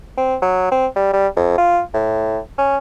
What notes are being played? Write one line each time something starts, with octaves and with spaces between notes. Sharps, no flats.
C4
F#3
C4
G3
G3
F2
F4
A2
C#4